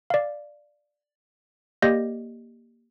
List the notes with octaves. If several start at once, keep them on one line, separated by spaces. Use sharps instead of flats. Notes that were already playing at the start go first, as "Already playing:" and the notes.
D5 F5
A#3 G4 D5 D#5 G6 A#6